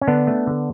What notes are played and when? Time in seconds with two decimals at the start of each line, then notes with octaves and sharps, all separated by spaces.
0.01 C#4
0.07 D3 B3 D4
0.27 A3
0.47 D3